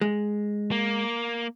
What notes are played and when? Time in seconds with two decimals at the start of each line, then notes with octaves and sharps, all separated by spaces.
0.01 G#3
0.71 A#3